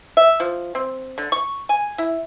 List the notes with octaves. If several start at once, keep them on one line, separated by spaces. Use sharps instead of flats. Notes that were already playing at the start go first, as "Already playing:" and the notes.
E5
F3
C4
D3
C#6
G#5
E4